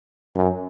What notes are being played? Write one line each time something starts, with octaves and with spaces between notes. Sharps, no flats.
F#2